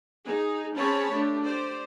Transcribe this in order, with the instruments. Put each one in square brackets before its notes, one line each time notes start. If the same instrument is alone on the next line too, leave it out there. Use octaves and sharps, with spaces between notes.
[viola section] D#4 G#4
C4 C#4 G#4 C#5 A5 B5
A3 D4 G4
G4 C5 D5